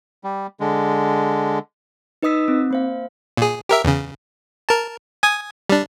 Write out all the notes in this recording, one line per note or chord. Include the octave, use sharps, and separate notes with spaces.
G3
D3 G#3
D#4 B4 D#5 D#6 E6 B6
C4
A#3 C5 F5
A#2 G#4
G4 A#4 E5
E2 C#3
A#4 A5
G#5 D#6 G#6
G3 D4